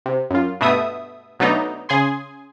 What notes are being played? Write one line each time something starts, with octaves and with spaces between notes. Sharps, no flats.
C3
F#2 F4
G2 B2 A3 E5 D#6
B2 F#3 A3 D4 D#4
C#3 G#4 G#5 C6